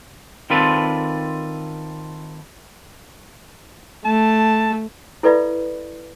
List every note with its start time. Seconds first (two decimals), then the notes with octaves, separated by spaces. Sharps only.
0.50 D#3 C4 F4 A4 B4 D5
4.05 A3 A5
5.23 E4 A4 B4 D5 E5 B5